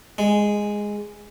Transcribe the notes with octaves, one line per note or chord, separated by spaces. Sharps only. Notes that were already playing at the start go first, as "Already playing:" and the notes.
G#3